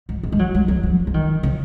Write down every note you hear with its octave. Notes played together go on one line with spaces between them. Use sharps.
G#2
G#2
G#3
F#3
G#3
F#3
F3
F3
D#3
C#3